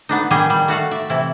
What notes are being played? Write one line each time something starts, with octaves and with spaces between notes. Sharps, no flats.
B3 D4 D#4
D#3 G3 B3 G4 G#4 D#5
A#2 G3
A3 F#4 F5 F#5
D5 E5
C3 E3 E4